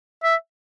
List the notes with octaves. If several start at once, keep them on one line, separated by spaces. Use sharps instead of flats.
E5